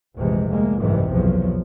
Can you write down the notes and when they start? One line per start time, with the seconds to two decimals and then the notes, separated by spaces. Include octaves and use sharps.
0.17 F1 A#1 C3 E3 G#3
0.50 D2 G#3 A#3
0.79 F#1 C2 G#2 C3 D#3 E3
1.11 B1 E2 F3 F#3